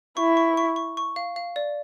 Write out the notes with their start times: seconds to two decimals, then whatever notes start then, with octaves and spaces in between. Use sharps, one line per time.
0.17 E4 C#6
0.37 C#6
0.57 C#6
0.76 C#6
0.97 C#6
1.16 F5
1.36 F5
1.56 D5